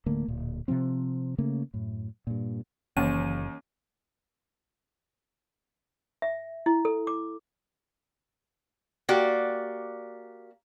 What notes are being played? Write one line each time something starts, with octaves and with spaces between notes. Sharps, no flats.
D1 D3 A3 A#3
D1 A#2
C3 E3 F3 C4
C#3 A3 A#3 C#4
F#2 A2
G2 A#2
F#1 D#2 E3 C#4 D#7
E5
E4
A4
D6
A#3 F#4 G4 D5